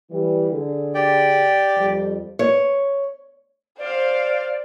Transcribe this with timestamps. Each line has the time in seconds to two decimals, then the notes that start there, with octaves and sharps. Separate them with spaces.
0.11 E3 G3
0.51 D3 G#4
0.95 G4 D5 G5
1.76 F2 G3
2.39 C#5
3.78 C5 D5 F5